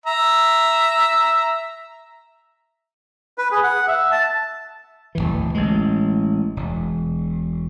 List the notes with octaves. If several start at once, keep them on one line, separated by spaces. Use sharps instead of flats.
E5 A#5
B4
G#4
F#5
E5
A5
D1 A#1 E3
A1 G#3
E1